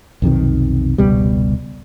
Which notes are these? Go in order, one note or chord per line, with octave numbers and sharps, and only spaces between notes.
B1 F2 C3 D#3
F1 C#2 B2 G3